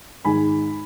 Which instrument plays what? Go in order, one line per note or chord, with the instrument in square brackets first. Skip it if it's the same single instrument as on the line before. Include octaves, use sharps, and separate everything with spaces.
[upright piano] G#2 D#3 G#3 G#5 B5